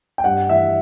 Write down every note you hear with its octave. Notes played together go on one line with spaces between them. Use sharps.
G5
G2 F#5
E3 E5